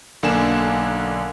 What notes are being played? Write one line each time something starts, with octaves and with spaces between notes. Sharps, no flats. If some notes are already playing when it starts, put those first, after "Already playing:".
B1 D3 A#3 D4 G#5 E7